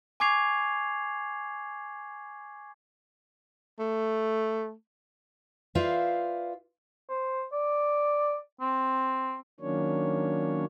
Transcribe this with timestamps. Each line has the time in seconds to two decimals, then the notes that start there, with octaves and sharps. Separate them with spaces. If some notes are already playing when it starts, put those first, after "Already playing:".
0.20 G#5 C#6 D6 G#6 C7 F7
3.79 A3
5.75 F4 B4 C5 D5 E5 F5
7.09 C5
7.52 D5
8.61 C4
9.60 D#3 F#3 A#3 C#4 D4 C#5